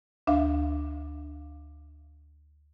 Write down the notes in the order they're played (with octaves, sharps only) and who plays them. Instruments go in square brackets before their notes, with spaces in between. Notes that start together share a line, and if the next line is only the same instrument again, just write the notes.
[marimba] D2 D4 E5 F5